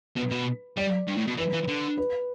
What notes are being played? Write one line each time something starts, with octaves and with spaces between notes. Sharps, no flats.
B2 B4
B2
G3 D5
G2
A2
B2
E3 B4
E3
D3
B4